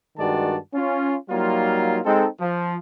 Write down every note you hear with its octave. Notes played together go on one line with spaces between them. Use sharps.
G2 D#3 G#3 F#4 D5 A5
C#4 F4
F#3 G3 A#3 D#4 F4
G#3 C4 D#4 A4
F3